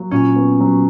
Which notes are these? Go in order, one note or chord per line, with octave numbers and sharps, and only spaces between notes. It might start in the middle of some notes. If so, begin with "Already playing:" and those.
Already playing: F#3 A#3
A#2 C#4
B3
F#3